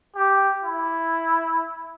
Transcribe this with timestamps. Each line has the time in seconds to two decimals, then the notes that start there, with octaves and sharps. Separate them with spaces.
0.15 G4
0.64 E4